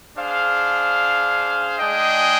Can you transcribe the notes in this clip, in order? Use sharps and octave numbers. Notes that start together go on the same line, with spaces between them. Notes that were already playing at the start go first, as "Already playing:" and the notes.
D4 G#4 C5 F5
G#3 D4 G#4 D#5 G5